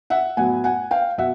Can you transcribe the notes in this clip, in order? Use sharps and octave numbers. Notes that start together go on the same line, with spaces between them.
E5 F#5
A2 F#3 B3 F#5 G#5
F#5 G#5
F5 G5
B2 E5 F#5